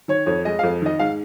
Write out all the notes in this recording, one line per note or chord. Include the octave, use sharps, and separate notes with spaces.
D#3 C#5
F2 C#5
G#3 D#5
F2 F5
D#3 D#5
G#2 F5